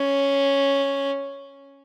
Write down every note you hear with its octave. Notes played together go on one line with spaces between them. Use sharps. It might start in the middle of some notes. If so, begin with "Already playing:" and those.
Already playing: C#4